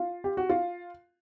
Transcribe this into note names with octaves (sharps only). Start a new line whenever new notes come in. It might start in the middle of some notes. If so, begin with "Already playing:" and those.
Already playing: F4
G4
F#4
F4